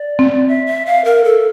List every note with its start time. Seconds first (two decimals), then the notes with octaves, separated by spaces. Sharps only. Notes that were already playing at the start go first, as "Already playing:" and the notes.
Already playing: D5
0.19 C4
0.48 E5
0.66 E5
0.86 F5
1.04 A#4
1.24 A4